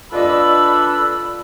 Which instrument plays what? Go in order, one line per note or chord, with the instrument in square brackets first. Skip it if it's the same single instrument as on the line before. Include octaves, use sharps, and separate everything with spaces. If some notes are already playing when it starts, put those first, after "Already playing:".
[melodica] D4 A4 B4 [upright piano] F4 D5 D#5 [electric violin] B5 [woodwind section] E6